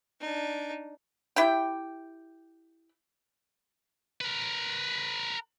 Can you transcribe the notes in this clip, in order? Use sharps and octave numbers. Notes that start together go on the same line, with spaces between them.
D4 D#4
E4 G4 G5
A#4 B4